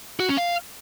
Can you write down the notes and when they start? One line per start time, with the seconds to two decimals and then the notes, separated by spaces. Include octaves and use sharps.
0.20 F#4
0.29 C#4
0.37 F5